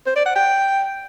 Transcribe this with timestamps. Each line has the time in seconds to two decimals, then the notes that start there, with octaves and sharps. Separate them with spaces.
0.06 C5
0.16 D5
0.26 F#5
0.35 G5